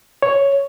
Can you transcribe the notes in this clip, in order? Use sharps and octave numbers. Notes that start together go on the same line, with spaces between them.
C#5